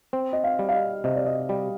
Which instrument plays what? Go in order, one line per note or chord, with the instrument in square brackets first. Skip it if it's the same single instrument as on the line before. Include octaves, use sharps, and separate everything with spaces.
[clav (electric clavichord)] C4
[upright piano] D#5
F5
[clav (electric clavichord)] G3
[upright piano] F5
D#5
[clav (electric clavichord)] C3 [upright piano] D#5
[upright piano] D5
D#5
[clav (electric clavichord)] G3